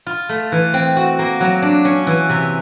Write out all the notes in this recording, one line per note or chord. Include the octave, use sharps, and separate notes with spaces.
F4
A3
E3
C4
F#4
A#3
F#3
D4
C#4
E3
C3